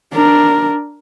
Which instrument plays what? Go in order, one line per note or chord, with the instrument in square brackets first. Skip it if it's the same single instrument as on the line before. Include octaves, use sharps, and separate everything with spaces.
[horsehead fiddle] D4 A#4